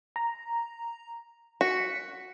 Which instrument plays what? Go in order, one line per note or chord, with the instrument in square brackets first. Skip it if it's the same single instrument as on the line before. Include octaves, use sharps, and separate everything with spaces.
[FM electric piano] A#5
[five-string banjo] F#4 [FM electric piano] B6 C#7